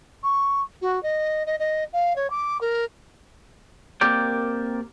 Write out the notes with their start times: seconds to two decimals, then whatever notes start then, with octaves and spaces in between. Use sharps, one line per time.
0.23 C#6
0.82 F#4
1.03 D#5
1.46 D#5
1.59 D#5
1.93 F5
2.16 C#5
2.30 D6
2.61 A#4
4.01 A#3 C4 G4 A#4 D5 G5